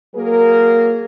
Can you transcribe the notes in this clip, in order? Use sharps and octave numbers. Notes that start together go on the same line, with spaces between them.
F#3 A#3 G#4 A#4